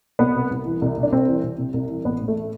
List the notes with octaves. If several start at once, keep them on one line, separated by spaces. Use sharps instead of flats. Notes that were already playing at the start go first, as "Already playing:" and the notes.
C2 B3
C3
C2
E3
C2
C3
D4
C2 C4
E3
C2
C3
C2
E3
A1 B3
A2
A3